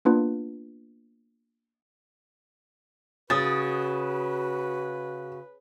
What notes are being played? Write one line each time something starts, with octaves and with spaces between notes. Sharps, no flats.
A#3 B3 D4 F4 B4
C#3 F#4 B4 D#6 A6